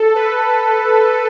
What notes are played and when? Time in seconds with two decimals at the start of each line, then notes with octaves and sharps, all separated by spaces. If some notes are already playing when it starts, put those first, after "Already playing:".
Already playing: A4
0.15 B4